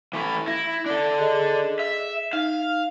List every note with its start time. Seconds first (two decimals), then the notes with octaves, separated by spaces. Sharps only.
0.13 E3 A3 B4
0.48 E4 A#6
0.86 D4 A4
1.19 G#4 D#5
1.79 E5
2.33 D#4 F5